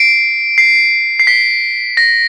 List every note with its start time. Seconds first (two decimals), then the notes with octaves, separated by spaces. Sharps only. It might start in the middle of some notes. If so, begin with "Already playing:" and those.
Already playing: C7 D7
0.58 C7
1.20 C7
1.27 B6
1.97 A#6